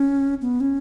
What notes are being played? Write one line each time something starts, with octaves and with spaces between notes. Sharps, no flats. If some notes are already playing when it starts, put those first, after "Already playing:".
Already playing: C#4
B3
C#4